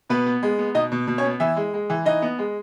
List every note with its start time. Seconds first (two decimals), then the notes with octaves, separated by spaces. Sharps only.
0.10 B2 B3 B4
0.26 B3
0.43 G#3
0.59 B3
0.74 B2 D#4 D#5
0.92 B2
1.07 B2
1.18 C#4 C#5
1.24 B3
1.40 E3 E4 E5
1.56 G#3
1.74 G#3
1.90 E3
2.06 E3 D#4 D#5
2.22 B3
2.39 G#3